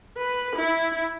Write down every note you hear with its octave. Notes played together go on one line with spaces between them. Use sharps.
B4
E4